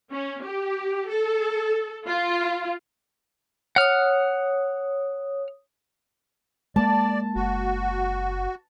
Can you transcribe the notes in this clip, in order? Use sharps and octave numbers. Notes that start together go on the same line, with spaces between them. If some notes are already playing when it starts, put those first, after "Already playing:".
C#4
G4
A4
F4
C#5 F#5 D#6 F6
G#3 A#3 D5 A5
F#1 F#4